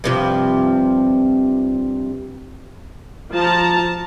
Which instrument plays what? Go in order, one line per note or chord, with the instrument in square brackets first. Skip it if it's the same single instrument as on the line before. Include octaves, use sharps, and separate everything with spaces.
[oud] G2 C3 F3
[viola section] F3 A5 A#5